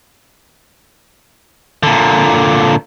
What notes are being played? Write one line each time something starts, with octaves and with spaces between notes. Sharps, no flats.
A#2 D3